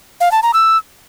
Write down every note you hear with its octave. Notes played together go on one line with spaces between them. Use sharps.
F5
A5
A#5
E6